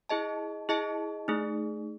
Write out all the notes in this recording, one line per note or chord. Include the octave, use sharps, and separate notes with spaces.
E4 G#4 D#5 A5
E4 G#4 D#5 A5
A3 D#4 G#4